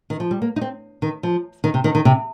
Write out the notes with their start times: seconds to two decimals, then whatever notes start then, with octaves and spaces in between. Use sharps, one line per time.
0.10 D#3
0.20 F3
0.31 G3
0.42 A#3
0.56 D#4
0.61 C4
1.02 D#3
1.23 F3
1.64 D#3
1.74 C3
1.84 D#3
1.95 D#3
2.05 C3